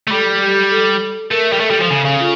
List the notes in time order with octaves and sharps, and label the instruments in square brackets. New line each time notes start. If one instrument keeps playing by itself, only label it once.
[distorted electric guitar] A3
[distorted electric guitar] G3 [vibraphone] A4
[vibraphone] G4
A4
[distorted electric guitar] A3 [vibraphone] A#4
[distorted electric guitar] G3
[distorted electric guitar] A3 [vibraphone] A4
[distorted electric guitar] G3
F3
C#3
C#3
[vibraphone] F4